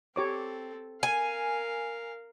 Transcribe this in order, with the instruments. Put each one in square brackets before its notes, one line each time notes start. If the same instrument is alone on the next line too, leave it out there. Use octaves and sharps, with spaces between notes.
[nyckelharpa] C4 A4 [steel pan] G4 C#5 D6
[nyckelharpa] A#4 F5 [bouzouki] G#5